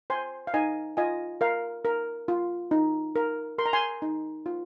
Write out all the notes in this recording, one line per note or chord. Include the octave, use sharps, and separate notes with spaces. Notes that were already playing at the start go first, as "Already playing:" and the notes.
C5 G#5 C6
F5
D#4 D#5 G#5
F4 D#5 G#5
A#4 F5
A#4
F4
D#4
A#4
A#4 C6
A#5
G#5 C6
D#4
F4